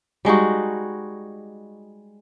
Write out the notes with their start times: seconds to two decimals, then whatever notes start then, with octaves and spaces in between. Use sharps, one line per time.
0.25 G3 G#3 D#4 F#4